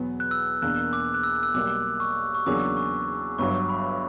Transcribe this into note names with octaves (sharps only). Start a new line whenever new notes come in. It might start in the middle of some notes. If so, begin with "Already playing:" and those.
Already playing: E2 B2 F#3 B3
F#6
E6
E2 B2 A#3 D4 A#4 F#6
D6
F#6
E6
E6
B1 B2 G3 A#3 D6
C#6
C#6
E2 C#3 F#3 A#3 D4 D6
C#6
G1 G2 F#3 C#6
C#6
B5